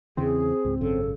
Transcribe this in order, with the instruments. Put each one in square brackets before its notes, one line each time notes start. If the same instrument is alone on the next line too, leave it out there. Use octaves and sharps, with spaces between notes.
[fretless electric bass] E2 C#3 E3 [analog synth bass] C4 [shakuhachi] G#4
[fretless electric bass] C#2 G#2
[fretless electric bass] G#1 F#2 C#3 [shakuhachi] A4